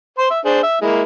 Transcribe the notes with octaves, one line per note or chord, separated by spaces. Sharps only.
C5 C6
E5
D4 G#4 C5
E5
G#3 A#3 E4